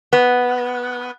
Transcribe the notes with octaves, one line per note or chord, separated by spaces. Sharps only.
B3